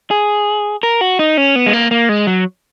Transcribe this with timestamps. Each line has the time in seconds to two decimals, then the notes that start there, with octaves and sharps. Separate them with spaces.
0.11 G#4
0.83 A#4
1.01 F#4
1.19 D#4
1.37 C#4
1.56 B3
1.66 G#3
1.73 A#3
1.91 A#3
2.09 G#3
2.27 F#3